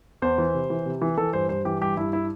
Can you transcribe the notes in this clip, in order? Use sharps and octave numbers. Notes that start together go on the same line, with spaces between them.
E2 C5
E3
C3
E3
C3
E3
E3 A4
G2 C5
G2 C5
E3 G4
G2 G4
G2 E4
E4